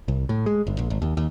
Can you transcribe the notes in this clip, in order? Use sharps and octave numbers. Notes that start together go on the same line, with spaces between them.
C2
A2
G#3
G1
A#1
G#1
D#2
D#2